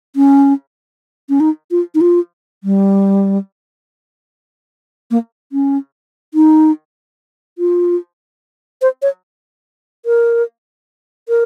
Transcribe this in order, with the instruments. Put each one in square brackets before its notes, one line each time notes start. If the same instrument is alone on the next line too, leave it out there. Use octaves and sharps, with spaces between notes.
[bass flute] C#4
C#4
D#4
F4
D#4
F4
G3
A#3
C#4
D#4
F4
C5
C#5
A#4
A#4